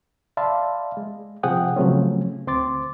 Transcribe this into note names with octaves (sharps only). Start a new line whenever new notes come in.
D5 E5 F5 A5 B5 C6
G#3
C3 F3 G#4 F#5 G5 D#6
C#3 F3 F#3 A3 C4 C#4
D2 C4 C6 D6 A6